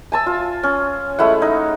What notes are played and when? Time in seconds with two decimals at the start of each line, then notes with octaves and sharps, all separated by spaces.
0.12 G#5 A5 E6
0.26 F4
0.63 C#4
1.19 G#3 A3 E4 F#5
1.42 D#4